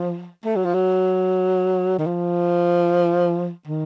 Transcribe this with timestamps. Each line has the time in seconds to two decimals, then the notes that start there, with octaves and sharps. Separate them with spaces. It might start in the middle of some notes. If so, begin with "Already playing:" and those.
Already playing: F3
0.45 A3
0.55 F#3
0.65 F3
0.74 F#3
1.98 D#3
2.06 F3
3.67 D#3